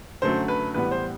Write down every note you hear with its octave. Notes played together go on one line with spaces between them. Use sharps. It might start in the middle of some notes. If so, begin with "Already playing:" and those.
F#2 D3 F#3 A3 C5
B4
A1 A2 G3 B3 B4
C5